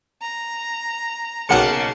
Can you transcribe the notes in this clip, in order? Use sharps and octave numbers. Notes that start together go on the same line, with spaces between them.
A#5
B1 C#3 A#3 F#5 A5 C#7